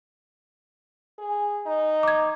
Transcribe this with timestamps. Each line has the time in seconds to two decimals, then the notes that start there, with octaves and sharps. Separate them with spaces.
1.18 G#4
1.66 D#4
2.03 D6 G#6